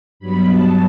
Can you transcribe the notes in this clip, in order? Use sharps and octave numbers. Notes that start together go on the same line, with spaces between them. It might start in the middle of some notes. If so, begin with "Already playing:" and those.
G2 F#3 B3 B5
A5